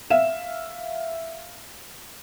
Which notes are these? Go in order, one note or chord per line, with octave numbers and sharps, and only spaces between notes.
E5 F5 E7